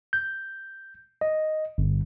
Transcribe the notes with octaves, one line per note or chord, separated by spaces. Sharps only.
G6
D#5
G1